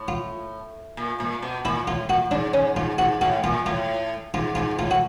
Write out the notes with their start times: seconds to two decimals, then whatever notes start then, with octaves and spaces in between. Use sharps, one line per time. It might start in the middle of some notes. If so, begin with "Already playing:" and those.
Already playing: A2
0.08 F4
0.97 A#2
1.20 A#2
1.42 B2
1.65 A#2 E4
1.87 A2 F4
2.09 A#2 F#4
2.31 G#2 D4
2.54 G#2 C#4
2.76 G#2 F4
2.98 G#2 F#4
3.21 A2 F#4
3.44 A#2 F4
3.66 A2 F4
4.34 G#2 F4
4.55 G#2 F4
4.79 A2 F4
4.91 F#4